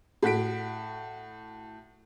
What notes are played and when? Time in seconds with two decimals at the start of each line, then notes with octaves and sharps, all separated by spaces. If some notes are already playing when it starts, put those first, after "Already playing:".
0.22 A2 F#4 F#5 B6 D7